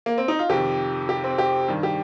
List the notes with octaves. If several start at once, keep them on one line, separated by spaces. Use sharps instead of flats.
A#3
C4
D#4
F4
F2 C3 D#3 G4
G4
C4
G4
G2 D#3
G4